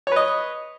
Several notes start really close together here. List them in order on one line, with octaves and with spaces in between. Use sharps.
C#5 B4 D#5